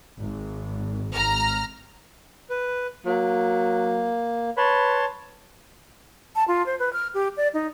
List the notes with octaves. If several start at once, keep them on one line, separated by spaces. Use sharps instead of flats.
G#1
G#1 A#5 F6
B4
F#3 A#3
B4 C#5 A5 C6
A5
F4
C5
B4
F6
G4
D5
D#4